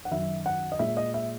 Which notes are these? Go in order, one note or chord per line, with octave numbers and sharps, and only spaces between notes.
F#5
F#2 D#3 F#3 E5
F#5
D#5
A#2 G#3 E5
D#5
E5